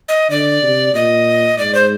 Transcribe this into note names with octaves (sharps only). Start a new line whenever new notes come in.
D#5
D3 D5
C3
A#2 D#5
G#2 D5
C5